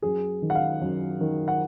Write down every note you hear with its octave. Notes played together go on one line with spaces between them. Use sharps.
F#2 G#4
D#3
F#5
F5
F#2
D#3
F#5